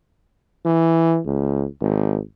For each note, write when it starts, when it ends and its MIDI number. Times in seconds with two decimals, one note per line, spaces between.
0.66 1.20 52
1.26 1.66 37
1.81 2.19 32